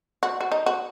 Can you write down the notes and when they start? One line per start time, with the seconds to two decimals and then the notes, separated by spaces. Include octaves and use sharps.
0.23 F#4
0.41 F#4
0.52 D#4
0.66 F#4